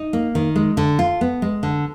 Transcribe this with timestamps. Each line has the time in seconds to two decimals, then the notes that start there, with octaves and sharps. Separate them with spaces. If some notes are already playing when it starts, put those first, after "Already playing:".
Already playing: D#4
0.13 A#3
0.35 D#3
0.56 G#3
0.77 D3
0.99 F4
1.21 B3
1.42 G#3
1.63 D3